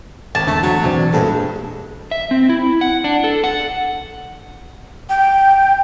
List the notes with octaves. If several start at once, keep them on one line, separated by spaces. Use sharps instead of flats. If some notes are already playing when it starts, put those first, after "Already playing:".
G#1 A5
E2 D3 A3 C#6
F#3
E2 B2 C4 D4
G2 A#2 G#3 A4
E5
C4
E4
F#5
D4
A4
F#5
G5